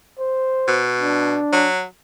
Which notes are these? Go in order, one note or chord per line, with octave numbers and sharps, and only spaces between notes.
C5
B2
D4
F#3